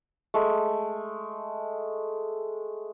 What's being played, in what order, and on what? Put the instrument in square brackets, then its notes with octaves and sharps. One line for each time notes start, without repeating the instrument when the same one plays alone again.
[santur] G#3 A3